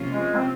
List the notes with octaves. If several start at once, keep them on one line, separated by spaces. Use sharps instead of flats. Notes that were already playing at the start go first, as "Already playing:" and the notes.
Already playing: C3 F3 A#3 C#4 F4
G#3
C4